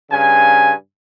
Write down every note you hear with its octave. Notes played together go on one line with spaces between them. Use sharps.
G2 C#3 G#5